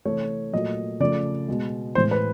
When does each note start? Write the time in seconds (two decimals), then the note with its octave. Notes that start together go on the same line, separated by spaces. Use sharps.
0.05 C3 E3 A3 C#5
0.53 A#2 F#3 A3 D#5
1.00 C#3 F3 A3 D5
1.48 B2 G#3
1.95 A2 E3 G#3 C5
2.11 B4